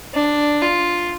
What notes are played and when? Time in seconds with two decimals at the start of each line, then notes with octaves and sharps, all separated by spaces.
0.14 D4
0.61 F4